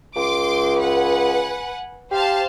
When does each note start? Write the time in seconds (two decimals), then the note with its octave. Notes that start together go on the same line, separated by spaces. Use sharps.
0.16 C#2 C6 D6
0.78 B4 F#5 G#5
2.11 G4 C5 F5 A5